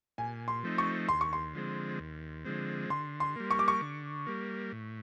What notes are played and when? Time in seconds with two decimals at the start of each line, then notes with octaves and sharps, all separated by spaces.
0.18 A#2 G#5
0.48 C6
0.63 F3 A3 C4 D#4
0.78 C#6
1.09 D#2 C6
1.21 C#6
1.33 C6
1.54 D3 F3 G#3 C4
1.99 D#2
2.45 D3 F3 G#3 C4
2.90 D3 C6
3.20 C6
3.36 G3 A#3
3.51 C#6
3.59 D6
3.68 C#6
3.82 D3
4.26 G3 A#3
4.72 A2